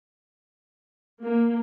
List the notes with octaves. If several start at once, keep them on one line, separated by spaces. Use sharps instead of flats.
A#3